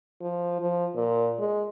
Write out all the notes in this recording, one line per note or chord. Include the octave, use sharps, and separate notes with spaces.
F3
F3
A#2
G#3